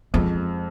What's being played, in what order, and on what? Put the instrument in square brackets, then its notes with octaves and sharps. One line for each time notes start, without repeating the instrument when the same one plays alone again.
[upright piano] F2 [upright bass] G#3